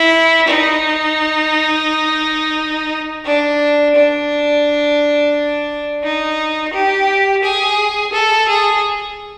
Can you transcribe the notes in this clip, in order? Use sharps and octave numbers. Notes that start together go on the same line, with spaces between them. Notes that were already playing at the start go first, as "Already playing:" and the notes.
Already playing: E4
D#4
D4
D4
D#4
G4
G#4
A4
G#4